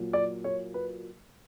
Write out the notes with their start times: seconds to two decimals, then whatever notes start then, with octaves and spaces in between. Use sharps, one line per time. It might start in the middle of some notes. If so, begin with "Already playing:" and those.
Already playing: A#2 F#3
0.13 D5
0.44 C#5
0.74 B4